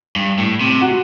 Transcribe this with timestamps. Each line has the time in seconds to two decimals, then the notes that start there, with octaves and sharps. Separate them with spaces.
0.16 G2
0.38 A2
0.61 C3
0.81 F#4